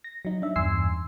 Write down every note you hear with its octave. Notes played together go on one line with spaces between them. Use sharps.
A#6
F#3 D#4
D4 E5
E2 G2 G#5 C6 E6 C7